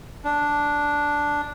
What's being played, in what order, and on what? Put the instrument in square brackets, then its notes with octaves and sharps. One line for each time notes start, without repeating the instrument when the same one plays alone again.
[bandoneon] D4